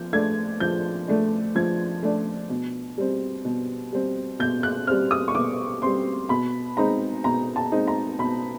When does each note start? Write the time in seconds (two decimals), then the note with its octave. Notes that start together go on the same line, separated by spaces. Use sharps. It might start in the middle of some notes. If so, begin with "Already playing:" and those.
Already playing: F3 G6
0.13 A3 D4 G#6
0.60 F3 G6
1.08 A3 D4
1.55 F3 G#6
2.03 A3 D4
2.50 B2
2.98 G3 C4
3.45 B2
3.93 G3 C4
4.39 B2 G6
4.63 F#6
4.87 G3 C4 F6
5.11 D#6
5.28 C#6
5.35 B2 D6
5.82 G3 C4 C6
6.29 B2 B5
6.77 G#3 C4 D#4 A#5
7.24 B2 A#5
7.56 A5
7.72 G#3 C4 D#4
7.87 A#5
8.19 B2 B5